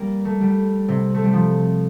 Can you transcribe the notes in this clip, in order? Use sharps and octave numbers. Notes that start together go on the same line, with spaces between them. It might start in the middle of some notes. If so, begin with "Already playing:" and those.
Already playing: G3 A#3
A3
G3
C3
A3
G3
F3